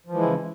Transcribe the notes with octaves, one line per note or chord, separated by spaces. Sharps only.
C#3 E3 F3 G#3 E4